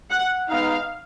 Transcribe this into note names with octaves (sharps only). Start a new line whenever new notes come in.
F#5
G#3 B3 D#4 F5